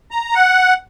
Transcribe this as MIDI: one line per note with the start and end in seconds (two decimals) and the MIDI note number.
0.11 0.35 82
0.35 0.74 78